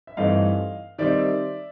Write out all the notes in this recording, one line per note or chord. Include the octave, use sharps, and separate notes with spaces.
E5
G2 E3 A3 C4 D#4 D#5 F5
D#3 G3 C4 D#4 D5 E5